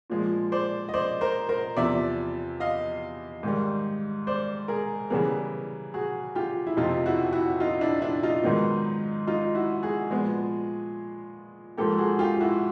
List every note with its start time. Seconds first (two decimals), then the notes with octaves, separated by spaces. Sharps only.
0.10 A#2 F3 G#3
0.52 C5 D5
0.89 D#5
0.94 C5 D5
1.21 A#4 C5
1.49 A#4 C5
1.77 E2 C3 F3 D5 E5
2.60 D#5 F5
3.43 G#2 D#3 G3
4.27 C5 D5
4.68 G#4 A#4
5.10 C#3 E3 G3 B3 G#4 A#4
5.94 F#4 G#4
6.36 F4 G4
6.67 E4
6.77 F2 C3 F3 D#4 F4
7.06 E4 F#4
7.33 E4 F#4
7.60 D#4 F4
7.81 D4 E4
8.02 D4 E4
8.23 D#4 F4
8.44 G#2 D#3 F#3 B3
9.27 D#4 F4
9.55 E4 F#4
9.83 F#4 G#4
10.11 A#2 F3 G#3 B3
11.78 G#2 F3 A#3 G4 A4
11.98 F#4 G#4
12.19 F4 G4
12.41 E4 F#4